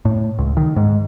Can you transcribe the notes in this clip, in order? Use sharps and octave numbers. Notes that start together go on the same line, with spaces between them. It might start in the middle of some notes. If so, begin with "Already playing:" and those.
A2
C#2
D#3
G#2